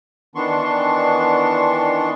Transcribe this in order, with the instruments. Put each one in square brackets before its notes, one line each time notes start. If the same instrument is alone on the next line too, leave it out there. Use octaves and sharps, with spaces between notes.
[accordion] D#3 E3 B3 D4 C6 C#6